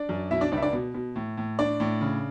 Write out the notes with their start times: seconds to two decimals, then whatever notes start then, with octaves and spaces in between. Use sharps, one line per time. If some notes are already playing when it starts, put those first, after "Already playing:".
Already playing: D4 D5
0.09 F#2
0.31 B2 E4 E5
0.41 D4 D5
0.52 C#2 D4 D5
0.57 E5
0.62 D4 D5
0.73 B2
0.94 B2
1.16 A2
1.37 A2
1.59 A2 D4 D5
1.80 A2
2.01 C#3